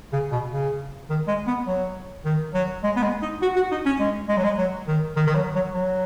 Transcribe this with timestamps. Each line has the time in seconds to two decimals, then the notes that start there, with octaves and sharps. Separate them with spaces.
0.13 C#3
0.32 B2
0.51 C#3
1.10 D#3
1.28 G#3
1.47 B3
1.67 F#3
2.25 D#3
2.54 F#3
2.84 G#3
2.96 B3
3.03 G#3
3.22 D#4
3.42 F#4
3.56 F#4
3.71 D#4
3.86 C#4
4.00 G#3
4.28 G#3
4.37 F#3
4.44 G#3
4.58 F#3
4.88 D#3
5.16 D#3
5.27 D#3
5.35 F#3
5.55 F#3
5.74 F#3